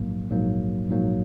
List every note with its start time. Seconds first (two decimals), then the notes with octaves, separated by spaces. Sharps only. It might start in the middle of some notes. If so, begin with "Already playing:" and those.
Already playing: A#1 G#2 F#3 A#3
0.30 A#1 G#2 F#3 A#3
0.88 A#1 G#2 F#3 A#3